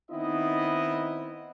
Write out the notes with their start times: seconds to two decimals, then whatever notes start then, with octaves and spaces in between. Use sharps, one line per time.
0.11 D#3 B3 C4 D#4 E4 D#5